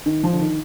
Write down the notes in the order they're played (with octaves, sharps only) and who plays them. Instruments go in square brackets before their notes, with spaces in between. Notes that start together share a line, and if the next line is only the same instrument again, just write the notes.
[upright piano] D#3
F3
D3
D#3